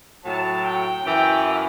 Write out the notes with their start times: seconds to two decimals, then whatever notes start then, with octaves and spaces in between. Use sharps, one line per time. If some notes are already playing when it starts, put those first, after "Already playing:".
0.24 A2 F#3 A5
0.63 G5
1.03 F#2 E3 G5